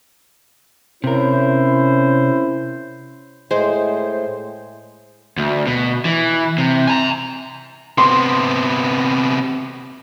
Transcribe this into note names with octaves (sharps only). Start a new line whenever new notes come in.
C3 C#4 E4 A#4 C5
A2 G#3 C5
D2
B2
E3
C3
G#5 A#5
C3 B3 C6